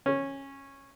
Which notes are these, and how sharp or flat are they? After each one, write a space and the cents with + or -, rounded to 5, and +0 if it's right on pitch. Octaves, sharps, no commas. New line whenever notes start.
C#4 -15